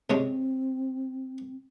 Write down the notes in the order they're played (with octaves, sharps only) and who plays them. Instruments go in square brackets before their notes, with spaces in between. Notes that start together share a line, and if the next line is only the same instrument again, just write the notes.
[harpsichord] C3 G#3 C#4 [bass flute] C4